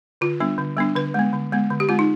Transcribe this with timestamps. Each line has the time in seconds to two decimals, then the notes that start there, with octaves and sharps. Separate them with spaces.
0.21 D3 F4
0.40 G3 B3 D4
0.58 D3
0.77 G3 B3 D4
0.96 D3 B4
1.14 G#3 B3
1.33 D3
1.52 G#3 B3
1.70 D3
1.80 G4
1.89 G#3 C4 F4
1.99 D#4